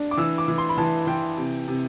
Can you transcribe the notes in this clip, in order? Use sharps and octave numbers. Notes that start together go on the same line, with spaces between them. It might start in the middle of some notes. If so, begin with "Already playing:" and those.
Already playing: D4
D6
E3 E6
D6
E3
C6
B5
E3 A5
E3 G5
C3
C3